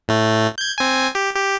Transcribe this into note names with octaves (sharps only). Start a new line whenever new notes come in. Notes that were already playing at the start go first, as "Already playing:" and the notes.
A2 A3
G6 G#6
C4 G#5
G4
G4